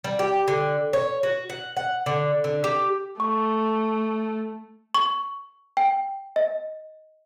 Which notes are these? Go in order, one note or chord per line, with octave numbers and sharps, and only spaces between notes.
G3
G4
D3
C#5
F#4
F#5
F#5
D3
D3
G4
A3 C#6
C#6
G5
D#5